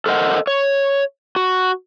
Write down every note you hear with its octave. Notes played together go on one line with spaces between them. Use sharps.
A4 A#4 C5 D#5 F#5
C#5
F#4